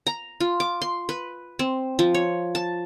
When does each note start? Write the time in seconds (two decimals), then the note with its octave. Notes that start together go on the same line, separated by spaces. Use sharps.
0.07 A#5
0.40 F4
0.60 D6
0.82 C6
1.09 B4
1.59 C4
1.99 F3
2.14 C#5
2.55 A5